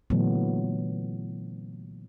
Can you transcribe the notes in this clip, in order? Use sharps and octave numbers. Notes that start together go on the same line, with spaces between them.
A#2 D3 E3 F#3 A3 B3